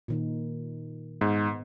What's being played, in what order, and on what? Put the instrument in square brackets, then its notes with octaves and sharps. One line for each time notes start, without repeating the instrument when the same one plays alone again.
[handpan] A#2 D#3 D#4
[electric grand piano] G#2 [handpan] B3